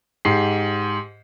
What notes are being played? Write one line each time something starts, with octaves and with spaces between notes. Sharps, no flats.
G#2 G4 C7